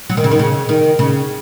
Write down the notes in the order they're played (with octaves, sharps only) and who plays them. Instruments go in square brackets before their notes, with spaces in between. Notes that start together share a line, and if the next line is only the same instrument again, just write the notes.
[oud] F#3
D#3
C#3
D#3
C#3
D#3
C#3